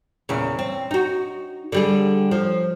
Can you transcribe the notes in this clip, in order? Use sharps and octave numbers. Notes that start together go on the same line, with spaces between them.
E2 A#2 C#3
C4
D#4 F#4
D3 G3 G#4
F3